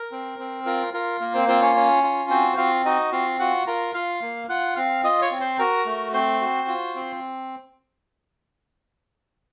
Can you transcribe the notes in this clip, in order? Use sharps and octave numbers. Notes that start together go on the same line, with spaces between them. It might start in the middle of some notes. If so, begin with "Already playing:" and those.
Already playing: A#4
C4
C4
F4 A#4
F4 A#4
A#3 A#4
C4 C5
C4 F4 C5
C#4 C#5
C#4 C#5
F4
C4 F#4 C5
C4 F4 F5
D#4 F#4 D#5
C4 F4 F5
F4 F#4 F#5
F4 A#4 A#5
F4 F5 F6
A#3
F4 F#5 F#6
C4 F5 F6
F4 D#5 D#6
C#5 C#6
C4
C5 C6
F#4 A#4 A#5
A3
C4 C5 C6
F#4
F4
C4